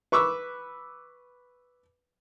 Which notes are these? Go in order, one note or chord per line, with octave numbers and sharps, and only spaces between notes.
B4 C#6 D6 E6